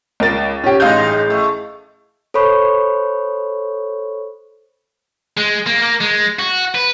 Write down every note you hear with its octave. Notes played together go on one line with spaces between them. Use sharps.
C#2 A#4 A6
C#4 G4
A1 G2 G#3 D#4 F5 G6
A3
A4 C5 C#5 B5 C#6
G#3
A#3
A#3
G#3
F#4
B4